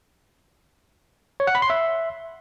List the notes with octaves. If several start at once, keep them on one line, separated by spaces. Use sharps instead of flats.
C#5
F#5
B5
C6
E5